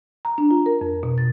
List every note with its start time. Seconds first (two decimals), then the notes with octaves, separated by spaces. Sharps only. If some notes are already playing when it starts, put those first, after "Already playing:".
0.25 A#5
0.38 D4
0.51 F4
0.66 A#4
0.81 F2
1.03 B2
1.18 A6